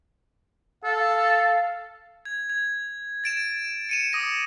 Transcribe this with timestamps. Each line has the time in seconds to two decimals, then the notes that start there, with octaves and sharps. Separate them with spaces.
0.84 A4 F5
2.25 G#6
2.50 G#6
3.24 A6 D7 E7
3.89 C#7 D#7 E7
4.13 D6 D#6 A#6